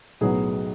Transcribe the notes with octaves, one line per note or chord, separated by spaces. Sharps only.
B1 A2 F#3 B3 G#4